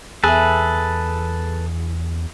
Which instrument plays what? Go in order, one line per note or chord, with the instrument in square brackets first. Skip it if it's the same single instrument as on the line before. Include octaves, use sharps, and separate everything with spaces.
[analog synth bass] E2 [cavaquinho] G#4 E5 [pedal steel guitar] A4 B4